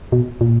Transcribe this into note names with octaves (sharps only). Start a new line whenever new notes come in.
B2
A#2